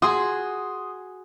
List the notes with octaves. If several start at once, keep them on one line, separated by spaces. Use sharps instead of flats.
F#4 G#4 C6 D#6